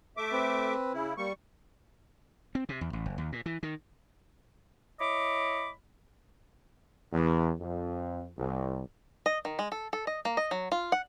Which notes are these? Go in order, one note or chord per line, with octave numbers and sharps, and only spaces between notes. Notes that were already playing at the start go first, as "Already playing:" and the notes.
A3 E5 D6
C4 B4
C#3 E4
G3 A#3 C#6
C4
C3
E2
A1
F#1
D#2
A#2
E3
D#3
E4 C#5 D#5 B5 D6
E2
F2
C2
D#5
D#3
G#3
A4
A4
D#5
A#3
D#5
F#3
F4
F#5